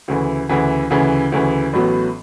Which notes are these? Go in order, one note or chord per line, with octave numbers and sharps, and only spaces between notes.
D2 C#3 E3
D2 C#3 E3
D2 C#3 E3
D2 C#3 E3
A1 A2 F#3 B3